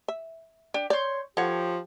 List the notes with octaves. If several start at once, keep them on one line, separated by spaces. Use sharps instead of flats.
E5
D4 G4
C#5 D5 C6 G6
F3 G4 A4 C#5 F#5